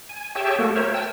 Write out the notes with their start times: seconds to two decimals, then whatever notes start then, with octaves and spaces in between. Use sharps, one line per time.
0.09 G#5
0.35 G4 G#4 C#5 E5 G5 A5
0.59 A3 A#3 F#4 A4
0.76 A#4 C5 C#5 E5
0.94 G5 A5 E6